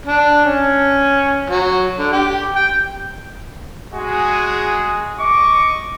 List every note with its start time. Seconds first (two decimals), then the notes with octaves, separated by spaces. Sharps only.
0.06 D4
0.45 C#4
1.50 F#3
1.98 D3
2.12 G4
2.56 G5
3.93 G#3 F#4 G#4
5.19 D#5 C#6 D6